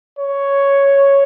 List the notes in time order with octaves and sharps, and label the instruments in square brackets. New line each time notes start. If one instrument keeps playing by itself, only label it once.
[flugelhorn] C#5